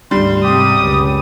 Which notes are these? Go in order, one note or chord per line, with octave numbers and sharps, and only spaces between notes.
D2 G#2 G3 C6
G#2 C3 G4 D#6
C#2 F#2